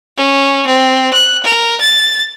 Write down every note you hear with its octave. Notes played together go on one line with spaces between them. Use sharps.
C#4
C4
F#6
A#4
A6